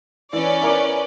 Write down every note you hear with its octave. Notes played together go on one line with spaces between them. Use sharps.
E3 C#4 B4 D5
E4 A#4 D6